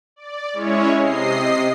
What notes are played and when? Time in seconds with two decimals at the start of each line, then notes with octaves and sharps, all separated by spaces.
0.16 D5
0.53 G#3 C#4 E4 C#5
0.99 C3 D#5 C7